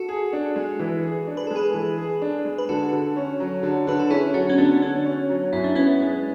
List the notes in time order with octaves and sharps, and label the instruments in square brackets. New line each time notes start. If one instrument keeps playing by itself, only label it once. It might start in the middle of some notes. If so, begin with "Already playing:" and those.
Already playing: [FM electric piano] F#4 A4
[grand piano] G#4
D4
G#3
E3
G#4
D4
[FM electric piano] B4
[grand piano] G#3 [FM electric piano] A4
[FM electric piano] G#4 B4
[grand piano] E3
G#4
D4
G#3
[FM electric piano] B4
[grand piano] D3 [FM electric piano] F#4 A4
[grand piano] D3
C#4
F#3
D3
[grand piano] D3 [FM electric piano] B4
[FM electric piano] A4
[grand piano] C#4 [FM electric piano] E4 G#4
[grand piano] F#3 [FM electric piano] D4 F#4
[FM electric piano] C#4
[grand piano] D3 [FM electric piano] B3 D4
[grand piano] D3 [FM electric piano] C#4
[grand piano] C#4
F#3
[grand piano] F#2 [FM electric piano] E4
[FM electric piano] D4
[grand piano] B3 [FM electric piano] C#4 E4
[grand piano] G#3